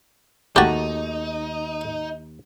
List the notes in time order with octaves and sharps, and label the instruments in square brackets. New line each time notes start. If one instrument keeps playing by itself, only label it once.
[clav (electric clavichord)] D#2 A#5 [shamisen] A3 F#4 [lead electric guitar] D#4 [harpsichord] G4 A5